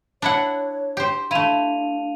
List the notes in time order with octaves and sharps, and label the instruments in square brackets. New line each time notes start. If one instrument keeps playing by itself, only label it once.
[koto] D4 E4 F#5 [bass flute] C#5
[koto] G4 C5
[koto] A3 E4 [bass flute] D4 [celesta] F5 D#7 F7